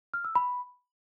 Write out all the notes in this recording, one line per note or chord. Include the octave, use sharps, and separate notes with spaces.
F6
E6
B5